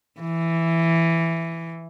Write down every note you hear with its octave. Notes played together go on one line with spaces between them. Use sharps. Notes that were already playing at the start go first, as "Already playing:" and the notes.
E3